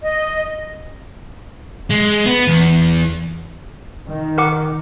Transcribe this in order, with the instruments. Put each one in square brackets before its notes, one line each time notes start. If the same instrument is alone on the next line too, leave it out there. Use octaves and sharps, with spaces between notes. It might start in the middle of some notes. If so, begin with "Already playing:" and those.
[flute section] D#5
[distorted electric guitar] G#3
B3
E2
[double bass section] D#3
[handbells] A#4 F#5 D6